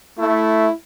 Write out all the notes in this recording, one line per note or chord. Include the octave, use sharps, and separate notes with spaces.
A3 E4